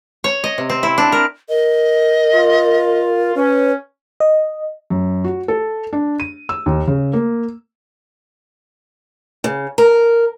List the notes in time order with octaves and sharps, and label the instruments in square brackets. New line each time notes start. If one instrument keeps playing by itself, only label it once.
[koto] C#5
D#5
C3
C4
E4
D4
A#4
[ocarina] A#4 [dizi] D#5
[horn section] F4
[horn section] C#4 [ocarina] B4
[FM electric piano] D#5
[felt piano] F#2
F#4
A4
D4
D#7
E6
D#2
C#3
A#3
[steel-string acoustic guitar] C#3
A#4